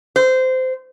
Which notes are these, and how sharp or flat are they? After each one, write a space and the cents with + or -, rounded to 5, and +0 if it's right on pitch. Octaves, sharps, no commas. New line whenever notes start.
C5 -20